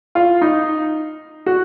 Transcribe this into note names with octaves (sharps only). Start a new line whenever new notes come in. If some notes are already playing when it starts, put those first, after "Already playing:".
F4
D#4
F#4